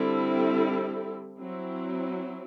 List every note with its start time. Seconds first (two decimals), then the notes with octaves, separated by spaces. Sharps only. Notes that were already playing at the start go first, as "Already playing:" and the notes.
Already playing: D3 G3 C4 E4 A4
1.40 F#3 C4 E4